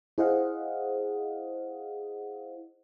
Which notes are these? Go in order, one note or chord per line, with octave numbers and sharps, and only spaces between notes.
E4 G#4 C5 D#5 F5 F#5